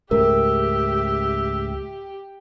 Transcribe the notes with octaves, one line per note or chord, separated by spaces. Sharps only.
C#2 G#2 A3 G4 A#4 E5